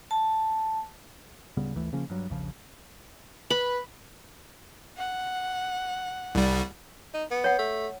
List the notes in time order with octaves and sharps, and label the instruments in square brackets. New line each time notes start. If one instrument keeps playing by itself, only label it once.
[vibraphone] A5
[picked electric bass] D1 C#3 G3 B3
G1 D2 E3 A3
C#3 F3 A#3 C#4
G2 F#3
E1 A#1 C#3 F3
[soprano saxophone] B4 [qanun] B5
[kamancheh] F#5
[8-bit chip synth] C2 G3
[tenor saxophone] D#4
B3
[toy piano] C#5 F#5
[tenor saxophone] A3